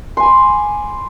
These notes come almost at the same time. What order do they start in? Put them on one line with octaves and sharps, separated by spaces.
C6 G#5 B5 D6